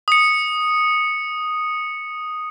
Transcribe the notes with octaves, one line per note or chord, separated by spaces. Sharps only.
D#6 C#7